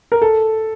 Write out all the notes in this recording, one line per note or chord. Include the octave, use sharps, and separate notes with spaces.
A#4
A4